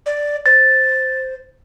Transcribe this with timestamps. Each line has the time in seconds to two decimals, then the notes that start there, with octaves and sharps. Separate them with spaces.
0.06 D5
0.46 C5 A6